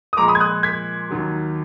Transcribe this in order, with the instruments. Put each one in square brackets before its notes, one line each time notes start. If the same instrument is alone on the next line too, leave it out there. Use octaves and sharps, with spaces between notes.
[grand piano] D#6
A#2 F3 G#3 A#5 D6
B5 D#6
G#6
D#6 F#6
G#6 B6
D#2 D#3 F#3